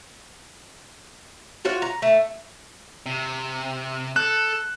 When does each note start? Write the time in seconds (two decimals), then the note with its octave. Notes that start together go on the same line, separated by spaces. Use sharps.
1.65 F4 F#4 C#5
1.82 A#5
2.02 A3
3.06 C3
4.16 A4 F#6